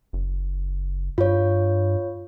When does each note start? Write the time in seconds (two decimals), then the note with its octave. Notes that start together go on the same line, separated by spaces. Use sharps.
0.13 F#1
1.18 G2 F4 C#5